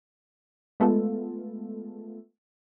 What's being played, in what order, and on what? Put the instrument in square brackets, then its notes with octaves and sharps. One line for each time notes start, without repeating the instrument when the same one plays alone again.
[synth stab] G#3 A3 B3 F4 A4